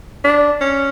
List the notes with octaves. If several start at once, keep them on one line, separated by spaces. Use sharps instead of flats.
D4
C#4